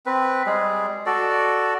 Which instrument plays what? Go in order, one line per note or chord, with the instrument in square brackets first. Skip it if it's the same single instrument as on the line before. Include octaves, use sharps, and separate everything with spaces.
[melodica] C4 B4
G3 G#3 G#4
F#4 A4 D5